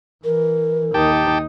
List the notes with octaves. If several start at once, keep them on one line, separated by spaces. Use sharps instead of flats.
E3 A#4
D#2 D#4 G4 G5 A5